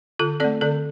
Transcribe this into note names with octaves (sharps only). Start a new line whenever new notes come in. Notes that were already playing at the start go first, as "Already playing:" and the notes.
D3 F4 A4
A3 C4 A4 D5
D3 A4 D5